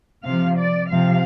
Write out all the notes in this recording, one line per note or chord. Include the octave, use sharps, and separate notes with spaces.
C3 F3 F5
D5
C3 F3 F5